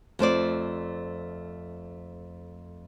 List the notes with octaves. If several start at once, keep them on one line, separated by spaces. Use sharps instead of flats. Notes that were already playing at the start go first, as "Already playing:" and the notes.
F2 A3 C5 D5